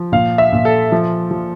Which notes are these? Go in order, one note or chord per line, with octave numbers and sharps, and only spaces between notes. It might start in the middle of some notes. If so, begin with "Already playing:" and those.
Already playing: F3
A#2 F5
E5
A#2
A4
F3
F3